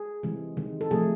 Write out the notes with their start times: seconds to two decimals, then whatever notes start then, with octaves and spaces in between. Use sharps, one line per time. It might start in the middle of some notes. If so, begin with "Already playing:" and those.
Already playing: G#4
0.23 C3 E3 G#3
0.57 C3 D#3 G#3
0.81 A4
0.91 C3 F3 A3 G#4